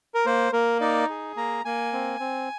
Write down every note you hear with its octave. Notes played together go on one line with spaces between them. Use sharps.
A#4
A#3 C5
A#3 A#4
D#4 D5
G#4
A#3 A#5
A#3 G#5
C4
C4